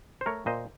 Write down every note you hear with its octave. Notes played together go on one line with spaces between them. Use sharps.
C5
A3 A#4 C#5
A#2 C5 D#5